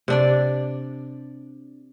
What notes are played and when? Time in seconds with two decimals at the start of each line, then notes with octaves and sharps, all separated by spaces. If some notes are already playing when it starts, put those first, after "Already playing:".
0.08 C3 D4 D5